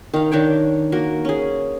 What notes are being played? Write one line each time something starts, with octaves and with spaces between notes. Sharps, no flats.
D#3 F5
D#3 D4 C#5 G5
A#3 F#4 A#4
C#4 G#4